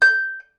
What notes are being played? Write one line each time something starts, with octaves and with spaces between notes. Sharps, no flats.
G6